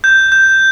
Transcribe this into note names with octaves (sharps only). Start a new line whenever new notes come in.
G6
G6